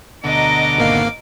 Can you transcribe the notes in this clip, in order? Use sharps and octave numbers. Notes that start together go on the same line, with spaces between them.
D2 B2 D3 D#5 A#5 D6
G#1 A#3 F5